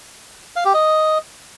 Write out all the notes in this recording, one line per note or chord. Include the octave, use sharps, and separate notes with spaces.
F5
G4
D#5